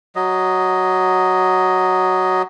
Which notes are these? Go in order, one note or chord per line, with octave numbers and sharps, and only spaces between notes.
F#3 D#5